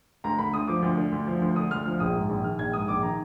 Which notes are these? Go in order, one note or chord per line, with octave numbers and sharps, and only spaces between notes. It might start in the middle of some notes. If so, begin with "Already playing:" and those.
D2 A#5
D3 B5
D2 D#6
F3 D6
D2
D3
D2
F3
D2
D3 D#6
D2 F6
F3 F6
A#1 D#6
G#2
A#1
D#3 F6
A#1 G#6
G#2 D#6
A#1 D6
D#3 A#5